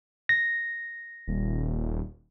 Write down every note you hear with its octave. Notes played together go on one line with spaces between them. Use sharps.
A#6
D#1